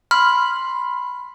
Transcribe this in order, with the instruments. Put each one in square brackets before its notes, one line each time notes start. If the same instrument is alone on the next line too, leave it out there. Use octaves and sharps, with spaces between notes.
[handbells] B5 [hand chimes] C6 [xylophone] F6